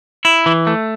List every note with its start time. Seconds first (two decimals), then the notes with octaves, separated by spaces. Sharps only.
0.25 E4
0.46 E3
0.67 A3